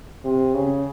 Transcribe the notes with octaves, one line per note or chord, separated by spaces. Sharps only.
C3
C#3